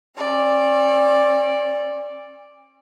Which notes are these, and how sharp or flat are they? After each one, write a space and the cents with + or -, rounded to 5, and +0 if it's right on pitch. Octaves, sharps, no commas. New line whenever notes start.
C#4 -45 D5 +0